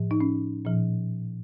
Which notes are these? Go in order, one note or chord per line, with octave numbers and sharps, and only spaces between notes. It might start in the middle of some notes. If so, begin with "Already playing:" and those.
Already playing: A2 F3
D#4
C#4
A#2 F3